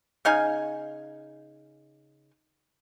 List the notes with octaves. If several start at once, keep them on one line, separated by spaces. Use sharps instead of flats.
C#3 D#4 F5 G#5